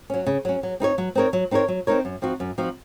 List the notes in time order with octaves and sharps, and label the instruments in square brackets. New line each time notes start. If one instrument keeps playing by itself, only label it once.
[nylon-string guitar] F#3 C#4
C#3
F#3 C#4
F#3
C4 D#4 A#4 C#5
F#3
C4 D#4 A#4 C#5
F#3
C4 D#4 A#4 C#5
F#3
C4 D#4 A#4 C#5
F#2
F3 C4 D#4 F#4
F#2
F3 C4 D#4 F#4